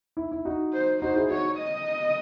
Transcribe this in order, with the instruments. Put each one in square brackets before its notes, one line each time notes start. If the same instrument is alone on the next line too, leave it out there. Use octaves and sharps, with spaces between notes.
[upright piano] E4
E4
D#4 F#4
[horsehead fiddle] C5
[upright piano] D#4 F#4 [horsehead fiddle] C5
[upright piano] E4 G#4
[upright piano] D#4 F#4 [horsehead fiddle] C#5
[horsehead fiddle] D#5